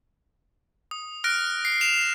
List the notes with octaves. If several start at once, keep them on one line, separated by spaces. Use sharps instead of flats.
D#6
F6 F#6 A#6 D7
C7
C7 E7 F7